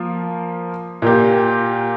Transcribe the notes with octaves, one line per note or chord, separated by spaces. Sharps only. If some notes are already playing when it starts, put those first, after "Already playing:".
Already playing: F3 A#3 F4
A#2 A#3 G4